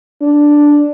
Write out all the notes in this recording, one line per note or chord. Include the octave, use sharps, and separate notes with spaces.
D4